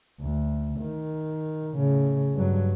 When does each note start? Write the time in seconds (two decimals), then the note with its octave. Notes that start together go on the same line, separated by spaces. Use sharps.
0.21 D2
0.80 D#3
1.76 A2 C#3
2.35 G2 F#3